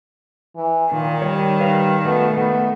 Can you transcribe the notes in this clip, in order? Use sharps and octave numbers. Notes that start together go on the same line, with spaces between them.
E3
A#2 D#3
G3 C#5
B4 F5
B2 A3
A3 B3